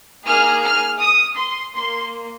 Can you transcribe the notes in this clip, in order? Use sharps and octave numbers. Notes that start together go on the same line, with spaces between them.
A#3 D#4 G#4 F6
F6
D#6
C6
A#3 C6